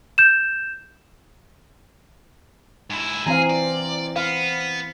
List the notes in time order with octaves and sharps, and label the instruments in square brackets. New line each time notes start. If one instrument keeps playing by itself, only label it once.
[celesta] G6 E7
[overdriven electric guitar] G#2 E4
[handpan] E3 C4 F5 [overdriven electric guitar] G#4 [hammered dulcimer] C5 G#5 A#5
[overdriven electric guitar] D5
[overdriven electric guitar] B3 [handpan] F5